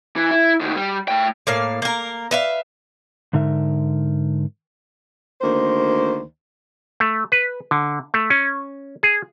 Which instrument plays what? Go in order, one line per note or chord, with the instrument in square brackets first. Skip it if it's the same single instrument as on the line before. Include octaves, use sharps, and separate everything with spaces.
[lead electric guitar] E3
E4
D2 D#3
G3
A3 G5
[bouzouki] A2 A#3 F5
A#3 A#4
B4 E5 F5
[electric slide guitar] G#2 D3 D#4 A#4 E5
[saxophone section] D2 D#3 A#3 C5
[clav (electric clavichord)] A3
B4
D3
A3
C#4
G#4